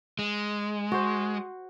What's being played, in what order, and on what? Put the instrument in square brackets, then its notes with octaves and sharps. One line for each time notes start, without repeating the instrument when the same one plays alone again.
[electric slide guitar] G#3
[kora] F#4 C5